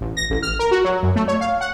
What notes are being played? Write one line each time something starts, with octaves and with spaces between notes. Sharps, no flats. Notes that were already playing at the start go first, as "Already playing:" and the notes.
A1
A#6
A1
F6
A#4
F#4
F#3
F#2
A3
C#5
F5
F#5